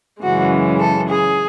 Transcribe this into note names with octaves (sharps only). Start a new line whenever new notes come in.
F#2 C#3 E3 G#3 F#4
A4
G#4